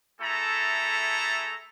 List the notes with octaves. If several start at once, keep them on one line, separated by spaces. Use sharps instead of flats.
A3 E4 G#4 A4 A5 A#5